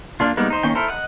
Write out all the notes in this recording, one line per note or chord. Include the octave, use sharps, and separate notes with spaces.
A#3 D4 F4
G3 G#3 A#3 B3 D#4
D#4 C5
D#3 A#3 C#4 G5
E4 A4 A#4 C5
D#5 F#5